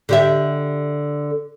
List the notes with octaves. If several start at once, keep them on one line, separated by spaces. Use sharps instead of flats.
D3 G4 E5